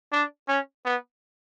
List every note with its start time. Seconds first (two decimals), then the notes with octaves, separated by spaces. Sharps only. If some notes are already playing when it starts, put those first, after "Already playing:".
0.12 D4
0.48 C#4
0.85 B3